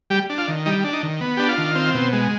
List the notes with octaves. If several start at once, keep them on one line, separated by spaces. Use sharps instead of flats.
G3 G4
D4
F4
D#3
G3 D#4
D4
D#4
D#3
B3
D4 G4
F4
D#3
C4
B2
G#3